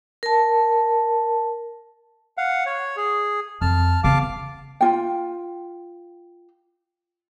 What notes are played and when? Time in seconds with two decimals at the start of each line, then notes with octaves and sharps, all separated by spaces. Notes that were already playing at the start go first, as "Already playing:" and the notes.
0.23 A#4 A5
2.38 F5 F#5
2.66 C#5
2.97 G#4
3.61 F2 A5 F6
4.04 C#3 B3 F5 A5 D6
4.81 F4 G5